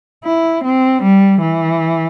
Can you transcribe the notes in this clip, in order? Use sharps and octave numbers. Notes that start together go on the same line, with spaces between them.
E4
C4
G3
E3